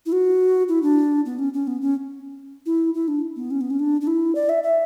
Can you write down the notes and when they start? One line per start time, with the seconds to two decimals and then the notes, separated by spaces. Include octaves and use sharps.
0.06 E4
0.12 F#4
0.69 E4
0.83 D4
1.26 B3
1.39 C#4
1.54 C#4
1.67 B3
1.81 C#4
2.66 E4
2.94 E4
3.08 D4
3.36 B3
3.51 C#4
3.61 B3
3.70 C#4
3.79 D4
4.01 D4
4.07 E4
4.35 D5
4.49 E5
4.63 E5